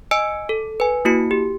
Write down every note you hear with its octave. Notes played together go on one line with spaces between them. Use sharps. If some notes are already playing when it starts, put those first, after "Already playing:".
D#5 G#5 E6 C#7 D7
A4
B4 G#5
A#3 E4 F#4 C#7
G4